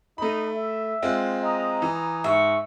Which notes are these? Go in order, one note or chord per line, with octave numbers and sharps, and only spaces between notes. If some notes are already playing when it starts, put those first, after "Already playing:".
A3 D#4 B5
E5
G#3 C4 F4
D#5 A#5 D#6
E3
G#2 E5 C#6